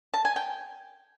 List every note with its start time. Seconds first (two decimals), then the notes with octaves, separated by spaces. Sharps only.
0.14 A5
0.25 G#5
0.36 G5